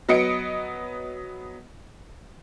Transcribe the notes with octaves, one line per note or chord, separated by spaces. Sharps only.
F#3 B3 D#5 C#7 D7